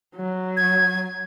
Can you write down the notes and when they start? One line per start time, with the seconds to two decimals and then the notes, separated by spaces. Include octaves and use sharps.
0.16 F#3
0.57 G#6